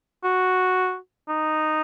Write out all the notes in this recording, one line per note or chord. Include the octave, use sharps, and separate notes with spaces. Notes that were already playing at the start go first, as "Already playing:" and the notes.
F#4
D#4